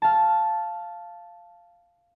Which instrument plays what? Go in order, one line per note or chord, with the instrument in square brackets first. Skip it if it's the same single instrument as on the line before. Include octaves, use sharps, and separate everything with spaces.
[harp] F5 A5